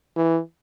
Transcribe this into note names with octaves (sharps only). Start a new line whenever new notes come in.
E3